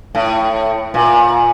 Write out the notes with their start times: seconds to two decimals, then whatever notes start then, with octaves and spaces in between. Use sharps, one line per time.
0.15 A2
0.94 A#2